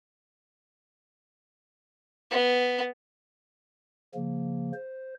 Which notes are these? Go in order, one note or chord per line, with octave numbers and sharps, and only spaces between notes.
B3
C#3 F3 A#3
C5